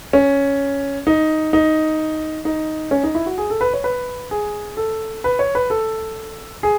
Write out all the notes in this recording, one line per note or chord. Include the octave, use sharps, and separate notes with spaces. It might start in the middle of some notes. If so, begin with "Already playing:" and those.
C#4
D#4
D#4
D#4
C#4
D#4
E4
F#4
G#4
A4
B4
C#5
B4
G#4
A4
B4
C#5
B4
A4
G#4